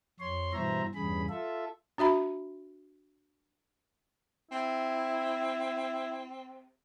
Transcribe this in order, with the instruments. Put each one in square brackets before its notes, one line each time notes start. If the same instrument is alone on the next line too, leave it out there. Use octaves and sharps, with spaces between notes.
[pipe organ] F2 C#5 C6
G2 B2 E3 C5 E5 A#5
E2 G2 C#3 G#4 B5
F4 A4 E5
[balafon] D4 F#4 E5 B5
[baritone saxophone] C4 [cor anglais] E4